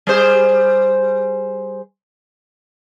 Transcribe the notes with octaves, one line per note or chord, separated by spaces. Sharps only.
G3 G#4 C5